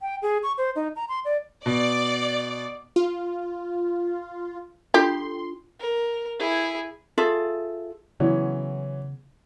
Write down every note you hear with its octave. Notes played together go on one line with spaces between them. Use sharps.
G5
G#4
C#6
C5
D#4
A#5
C6
D5
B2 D5
F4
D4 F4 G4 A4 C6
A#4
E4 G#4
F4 G#4 A4 E5
C#3 E3 F#3 B3 C#4